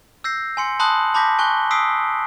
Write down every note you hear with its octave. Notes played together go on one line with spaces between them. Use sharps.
E6 G6 A#6 C7
G#5 C6 C#7
A5 B5 C6 D#6 F#6 F#7
A5 B5 D6 G6 A#6 B6
G#5 C#6 F#6 G7
D#6 E6 B6 C7 D7